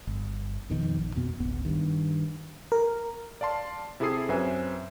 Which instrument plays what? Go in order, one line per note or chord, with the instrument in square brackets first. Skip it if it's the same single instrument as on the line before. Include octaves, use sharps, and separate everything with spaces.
[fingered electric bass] G1
F2 B2 D#3
A#1
F2 B2 B3
D1 G#1 B3
G2 D#3
[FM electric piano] A#4
[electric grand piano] D5 F5 A5 C6
C3 E4 G#4 A4 D#6 C7
F#2 C4 B4 C5 E5 G#5